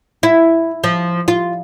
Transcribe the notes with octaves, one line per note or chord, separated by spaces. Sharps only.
E4
F3
F4